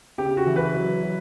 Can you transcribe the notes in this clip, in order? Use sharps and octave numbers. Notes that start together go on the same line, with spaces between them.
C#3 G4
F#4
E3
B4
F#3
F#3